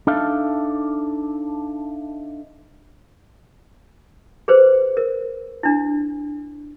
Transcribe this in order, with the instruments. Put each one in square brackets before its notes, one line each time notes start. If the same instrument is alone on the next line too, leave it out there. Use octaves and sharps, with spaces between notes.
[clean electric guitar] D4 D#4 A4 E5 F5
[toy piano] G#4 B4 C5
A#4
D4 E4